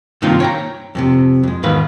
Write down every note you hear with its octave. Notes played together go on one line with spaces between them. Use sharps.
G2 C3 D#3 A#3 D#4 F4
C#5 G5 A#5
F2 A2 C3
F2 G#3
E2 G#2 D#3 B4 F5